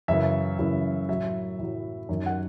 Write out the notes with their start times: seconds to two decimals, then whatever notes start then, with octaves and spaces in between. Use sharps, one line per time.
0.08 F#2 C#3 E3 E5
0.59 F#2 C#3 E3
1.09 A2 F#3 E5
1.59 A2 F#3
2.09 F#2 D#3 F#3
2.26 F#5